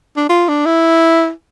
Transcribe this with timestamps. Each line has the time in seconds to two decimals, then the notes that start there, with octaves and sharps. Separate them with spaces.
0.17 D4
0.29 F4
0.49 D4
0.66 E4